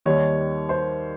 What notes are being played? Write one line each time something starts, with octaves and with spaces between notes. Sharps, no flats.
D#2 D#3 G3 C#5
C5